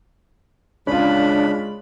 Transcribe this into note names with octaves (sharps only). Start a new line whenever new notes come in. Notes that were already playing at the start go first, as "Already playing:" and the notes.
C#3 G#3 C#4 D4 F4 B5